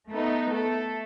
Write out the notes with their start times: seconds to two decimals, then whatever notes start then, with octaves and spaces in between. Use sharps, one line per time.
0.10 A3 B3 D#4
0.51 A3 A4